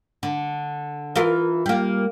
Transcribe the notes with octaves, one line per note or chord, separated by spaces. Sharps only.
D3
E3 F4 A#4
G3 A#3